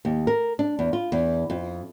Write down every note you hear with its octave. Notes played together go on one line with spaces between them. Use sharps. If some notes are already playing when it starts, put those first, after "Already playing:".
D#2
A#4
D4
E2
F4
E2
F2